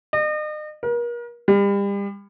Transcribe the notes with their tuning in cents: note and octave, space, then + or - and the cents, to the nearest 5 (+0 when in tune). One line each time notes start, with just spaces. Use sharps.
D#5 -40
A#4 +40
G3 +35